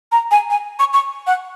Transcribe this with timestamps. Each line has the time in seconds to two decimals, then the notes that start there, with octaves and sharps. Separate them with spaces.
0.12 A#5
0.31 G#5
0.50 G#5
0.79 C#6
0.94 C#6
1.27 F#5